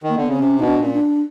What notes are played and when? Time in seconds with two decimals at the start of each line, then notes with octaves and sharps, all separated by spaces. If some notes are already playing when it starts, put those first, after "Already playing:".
0.03 D#3
0.09 A#3
0.17 D3 B3
0.28 C#3 C4
0.39 C3 C#4
0.59 B2 D#4
0.66 D4
0.79 A#2
0.85 C#4
0.93 D4